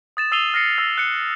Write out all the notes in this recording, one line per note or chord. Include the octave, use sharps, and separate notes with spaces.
D#6 A6 E7
D#6 E6 C7 D#7 F7 G7
F6 A#6 C7 C#7
E6 A6 A#6
F#6 C#7